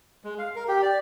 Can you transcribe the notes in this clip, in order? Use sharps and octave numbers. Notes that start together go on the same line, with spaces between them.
G#3
F5
A#4
G4
D5